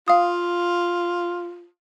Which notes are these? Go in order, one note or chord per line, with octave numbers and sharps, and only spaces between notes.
F4 F5 D#6